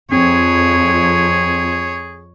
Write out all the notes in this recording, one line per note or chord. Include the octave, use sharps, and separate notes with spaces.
F2 C4 G#4 C#5